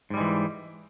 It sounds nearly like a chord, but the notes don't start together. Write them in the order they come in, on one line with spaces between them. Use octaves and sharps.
G#2 G3 G#3 E3